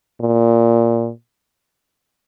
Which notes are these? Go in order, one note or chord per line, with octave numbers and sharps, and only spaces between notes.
A#2